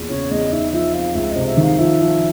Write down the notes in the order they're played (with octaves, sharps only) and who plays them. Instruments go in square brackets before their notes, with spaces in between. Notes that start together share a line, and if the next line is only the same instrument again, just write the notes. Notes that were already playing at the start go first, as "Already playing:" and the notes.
Already playing: [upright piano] E2 A#2
[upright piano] C#3 [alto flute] C#5
[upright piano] E2 [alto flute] D#5
[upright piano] D#4 [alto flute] E5
[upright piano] F3 [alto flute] E5
[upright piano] C4 [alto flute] F5
[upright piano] C#2 [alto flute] E5
[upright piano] C3 [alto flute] D#5
[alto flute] E5
[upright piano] D#3
[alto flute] F5
[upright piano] F3 [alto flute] E5
[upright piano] F3